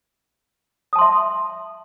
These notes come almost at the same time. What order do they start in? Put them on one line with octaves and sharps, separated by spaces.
D#6 A5 C6 E5